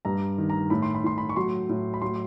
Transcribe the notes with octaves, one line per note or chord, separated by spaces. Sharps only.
G2 A#5
D#3
A#5
A2 B5
C6
B5
A2 C6
B5
C#6
F#3 C6
A2
B5
F#3 C6